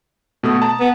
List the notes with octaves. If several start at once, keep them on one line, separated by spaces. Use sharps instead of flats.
B2 A3 D#6
A5 A#5
B3